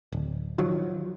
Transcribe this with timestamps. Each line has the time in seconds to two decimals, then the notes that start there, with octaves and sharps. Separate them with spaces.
0.12 D1
0.58 D#3 F3 F#3